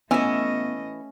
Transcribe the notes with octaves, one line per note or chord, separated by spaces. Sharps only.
E3 A3 B3 C#4 D#5 E5